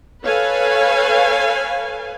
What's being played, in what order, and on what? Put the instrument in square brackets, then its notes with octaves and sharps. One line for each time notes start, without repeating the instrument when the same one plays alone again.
[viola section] A4 B4 C#5 F5 G#5